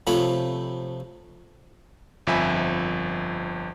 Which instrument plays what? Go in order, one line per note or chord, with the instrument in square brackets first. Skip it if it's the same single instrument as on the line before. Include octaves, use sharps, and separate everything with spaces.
[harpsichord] C3 F3 A3 C#5 B5
[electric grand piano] G1 F2 F3 E5 G#5 B5